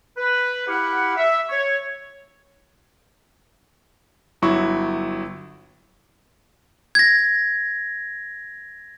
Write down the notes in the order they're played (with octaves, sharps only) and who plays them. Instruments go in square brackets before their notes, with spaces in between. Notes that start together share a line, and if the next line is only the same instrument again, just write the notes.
[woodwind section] B4
E4 G4 F5 F#5
E5
C#5
[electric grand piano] G1 F#3 E4 C#6
[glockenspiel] G#6 A#6